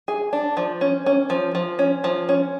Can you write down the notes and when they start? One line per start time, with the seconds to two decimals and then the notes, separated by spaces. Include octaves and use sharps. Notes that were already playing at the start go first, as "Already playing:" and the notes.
0.08 G#4
0.33 D4
0.57 F3
0.81 C#4
1.06 C#4
1.30 F3
1.55 F3
1.79 C#4
2.04 F3
2.29 C#4